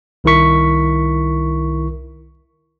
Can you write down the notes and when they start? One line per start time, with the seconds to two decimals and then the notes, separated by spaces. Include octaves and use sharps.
0.24 C2 D#3 E4 A#4 C#6 B6